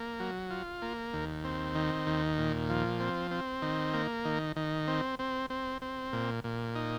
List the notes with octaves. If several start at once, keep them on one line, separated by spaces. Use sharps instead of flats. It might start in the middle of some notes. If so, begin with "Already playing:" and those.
Already playing: A#3
F#3
F4
A#3
D#2
C4
D#3
D#2
A#2
F3
C4
C4
D#3
A#3
D#3
D#3
C4
C4
C4
C4
A#2
A#2
D#4